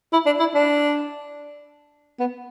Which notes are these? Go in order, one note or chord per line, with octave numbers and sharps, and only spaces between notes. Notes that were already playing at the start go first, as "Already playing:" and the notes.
E4
D4
E4
D4
B3